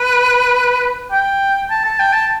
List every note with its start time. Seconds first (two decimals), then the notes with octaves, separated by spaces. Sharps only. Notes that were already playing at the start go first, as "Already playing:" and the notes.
Already playing: B4
1.11 G5
1.71 A5
1.85 A5
2.00 G5
2.13 A5